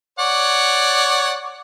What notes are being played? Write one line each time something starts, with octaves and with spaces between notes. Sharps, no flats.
C#5 D5 F#5